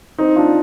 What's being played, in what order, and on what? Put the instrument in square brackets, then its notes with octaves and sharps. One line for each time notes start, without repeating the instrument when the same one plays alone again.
[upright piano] C4 D#4
D4 F4